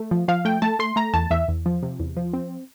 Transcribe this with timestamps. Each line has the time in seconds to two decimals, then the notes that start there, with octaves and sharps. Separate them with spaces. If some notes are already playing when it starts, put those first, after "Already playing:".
Already playing: A3
0.11 F3
0.28 F3 F5
0.45 A3 G5
0.62 A3 A5
0.79 A3 C6
0.96 A3 A#5
1.14 E2 A5
1.31 E2 E5
1.48 E2
1.66 F3
1.83 C3
2.00 E2
2.17 F3
2.34 C4